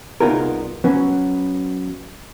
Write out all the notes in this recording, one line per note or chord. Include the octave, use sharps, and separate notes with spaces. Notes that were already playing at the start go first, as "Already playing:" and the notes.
C2 B3 D#4 F4 G#4 A#4
F#3 B3 C#4